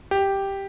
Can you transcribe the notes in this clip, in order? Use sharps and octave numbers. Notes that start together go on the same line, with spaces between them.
G4